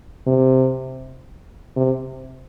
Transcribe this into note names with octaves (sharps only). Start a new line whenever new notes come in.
C3
C3